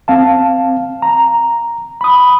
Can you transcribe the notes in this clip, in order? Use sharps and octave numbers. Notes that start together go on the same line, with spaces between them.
C4 F5 A5
A#5
B5 D#6